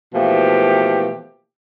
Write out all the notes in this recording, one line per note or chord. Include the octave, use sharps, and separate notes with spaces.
B2 E3 F3 A3 A#3 G4